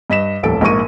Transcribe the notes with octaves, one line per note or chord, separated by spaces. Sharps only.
G2 D#5 B6 E7
D#1 A1 F2 A4 D7
A#1 G#2 A#3 A#4 C#6 D#7